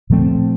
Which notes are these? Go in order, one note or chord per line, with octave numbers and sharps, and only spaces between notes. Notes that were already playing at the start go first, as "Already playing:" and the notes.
A#2 F3 A3 C4